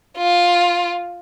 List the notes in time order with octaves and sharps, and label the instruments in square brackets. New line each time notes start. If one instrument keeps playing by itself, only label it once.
[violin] F4